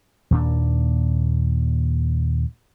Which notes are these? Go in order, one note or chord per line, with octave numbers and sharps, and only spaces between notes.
D#2 A#2 D4